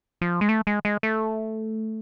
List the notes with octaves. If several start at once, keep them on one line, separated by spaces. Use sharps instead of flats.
F3
G#3
A3
G#3
G#3
A3